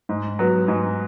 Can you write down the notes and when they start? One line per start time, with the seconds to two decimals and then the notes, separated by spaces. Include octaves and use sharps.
0.09 G#2
0.39 F#3 B3
0.68 G#2